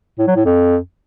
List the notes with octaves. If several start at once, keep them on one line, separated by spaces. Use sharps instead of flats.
A2
F#3
A2
F2